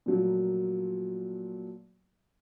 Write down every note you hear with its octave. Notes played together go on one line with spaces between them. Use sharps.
A#2 F3 F#3 A3 A#3